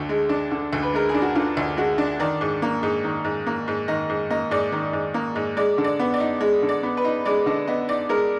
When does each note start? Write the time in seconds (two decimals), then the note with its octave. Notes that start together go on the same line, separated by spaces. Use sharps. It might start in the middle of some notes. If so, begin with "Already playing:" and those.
Already playing: D2 D3
0.09 G#3
0.29 D4
0.51 D3
0.73 D2
0.83 B4
0.94 G#3 A#4
1.09 G#4
1.14 D4
1.22 F#4
1.35 D3 F4
1.57 D2
1.77 G#3 F#4
1.98 D4
2.20 D#3 D5
2.41 G#2
2.62 A#3
2.83 G#2
3.04 D#3
3.24 G#2
3.46 A#3
3.68 G#2
3.88 D#3 D#5
4.10 G#2
4.30 A#3 D#5
4.51 G#2 D5
4.72 D#3
4.93 G#2
5.14 A#3
5.35 G#2
5.57 G#3 D5
5.78 D3
5.84 D5
5.99 B3
6.14 D5
6.20 D#4
6.41 G#3
6.62 D3
6.69 D5
6.83 B3
6.97 B4
7.04 D#4
7.25 G#3 D5
7.46 D3 D#5
7.67 B3 D#5
7.89 D#4 D5
8.09 G#3 A#4